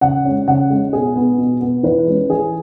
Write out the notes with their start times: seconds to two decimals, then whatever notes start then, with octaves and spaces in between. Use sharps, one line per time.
0.01 C#3 F#5
0.25 G#3 C#4
0.48 C#3 F#5
0.70 G#3 C#4
0.93 B2 G#4
1.16 B3
1.38 B2
1.61 B3
1.83 E3 B4
2.07 G#3 C#4
2.29 E3 G#4